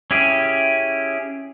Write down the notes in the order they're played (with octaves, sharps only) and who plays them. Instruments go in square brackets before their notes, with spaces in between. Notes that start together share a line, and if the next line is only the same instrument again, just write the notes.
[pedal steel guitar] C#4 E4 G4 G#4